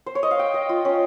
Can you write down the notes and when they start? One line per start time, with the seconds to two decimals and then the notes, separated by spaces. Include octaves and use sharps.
0.06 C5
0.15 C#5
0.23 D#5
0.31 F5
0.39 G5
0.54 D#5
0.69 F4
0.85 C#4